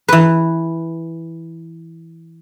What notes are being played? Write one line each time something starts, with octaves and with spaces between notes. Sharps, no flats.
E3 B4